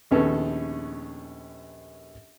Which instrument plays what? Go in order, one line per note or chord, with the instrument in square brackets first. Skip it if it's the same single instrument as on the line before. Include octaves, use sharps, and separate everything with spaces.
[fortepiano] A#1 D#2 B3 C#4 A4